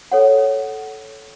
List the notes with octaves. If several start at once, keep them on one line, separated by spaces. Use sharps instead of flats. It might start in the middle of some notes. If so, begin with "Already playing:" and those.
A4 C#5 F#5